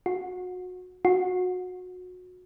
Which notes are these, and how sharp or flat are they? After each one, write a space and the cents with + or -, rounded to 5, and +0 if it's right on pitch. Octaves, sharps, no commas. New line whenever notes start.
F#4 -25
F#4 -25